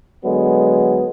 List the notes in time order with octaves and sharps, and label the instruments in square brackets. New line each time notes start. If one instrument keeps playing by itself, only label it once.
[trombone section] D3 F#3 G#3 B3